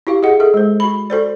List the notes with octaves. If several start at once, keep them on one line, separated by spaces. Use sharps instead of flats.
E4 F#4 G4 F5
G#4 D#5 F#5
G#4 A4 E5
G#3 C5
F#4 B5
F#4 A4 C5 D5